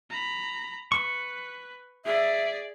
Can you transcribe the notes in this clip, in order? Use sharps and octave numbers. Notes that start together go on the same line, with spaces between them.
A#5 B5
B4 C#6
G#4 D5 E5